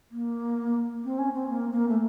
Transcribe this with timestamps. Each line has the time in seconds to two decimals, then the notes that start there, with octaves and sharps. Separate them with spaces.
0.11 A#3
1.04 C4
1.18 C#4
1.34 C4
1.49 A#3
1.72 A#3
1.89 A3